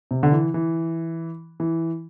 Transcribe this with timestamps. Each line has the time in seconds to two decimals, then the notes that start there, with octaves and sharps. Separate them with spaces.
0.11 C3
0.23 D3
0.32 E3
0.54 E3
1.60 E3